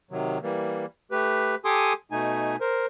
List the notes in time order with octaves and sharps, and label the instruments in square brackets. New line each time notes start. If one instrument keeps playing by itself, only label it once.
[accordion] C3 D#3 F#3
E3 G3 A#3
A3 G4 B4
G4 A4 G#5 C6 D6 D#6
B2 A3 D#4 G#5
A#4 C5